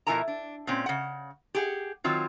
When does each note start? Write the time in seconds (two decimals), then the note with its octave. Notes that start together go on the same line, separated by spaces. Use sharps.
0.07 B2 F3 E4 A#4 G#5 A#5
0.28 D4
0.67 A#2 C4 C#4
0.86 C#3 F#5
1.55 G4 G#4 F#5
2.04 D#3 F#3 C4 F4